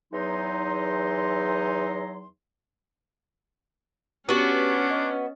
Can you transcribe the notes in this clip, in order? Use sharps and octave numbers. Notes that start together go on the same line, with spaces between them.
E2 F#3 D#4 C6
B3 C#4 D4 F#4 G4
D#5